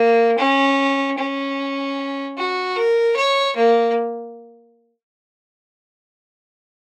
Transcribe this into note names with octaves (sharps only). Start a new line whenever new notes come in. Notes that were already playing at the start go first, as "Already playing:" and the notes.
Already playing: A#3
C#4
C#4
F#4
A#4
C#5
A#3